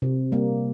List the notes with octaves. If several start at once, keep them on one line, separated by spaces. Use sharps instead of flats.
C3
G3 A#3